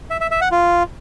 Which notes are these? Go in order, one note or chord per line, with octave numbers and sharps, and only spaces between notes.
E5
E5
E5
F#5
F4